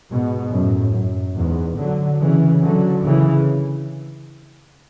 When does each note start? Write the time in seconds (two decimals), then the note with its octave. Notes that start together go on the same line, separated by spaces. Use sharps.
0.10 G#2 B2
0.53 F#2 A2
0.94 F#2
1.36 E2 G#2
1.78 D3 F#3
2.20 C#3 E3
2.62 D3 F#3
3.03 C#3 E3